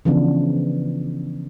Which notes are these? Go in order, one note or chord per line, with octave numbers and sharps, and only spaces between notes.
C#3 E3 F3 B3 D4